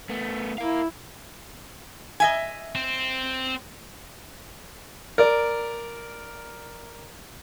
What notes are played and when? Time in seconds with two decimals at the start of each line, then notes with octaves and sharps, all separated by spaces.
0.09 A3 B3
0.58 E4 A#4 F5
2.20 D#5 E5 G#5
2.75 C4
5.18 A#4 D5